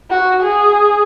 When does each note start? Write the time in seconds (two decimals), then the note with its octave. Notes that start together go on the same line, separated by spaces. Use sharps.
0.10 F#4
0.43 G#4